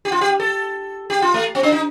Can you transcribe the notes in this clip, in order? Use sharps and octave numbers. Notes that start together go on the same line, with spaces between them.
G4
F4
G4
A4
G4
F4
A3
C4
D4
D#4